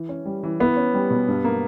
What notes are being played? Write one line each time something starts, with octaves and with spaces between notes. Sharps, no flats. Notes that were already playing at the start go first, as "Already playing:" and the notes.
Already playing: E3
C#4
G3
E3
B3 E4
C#4
G3
B2
G2
A#3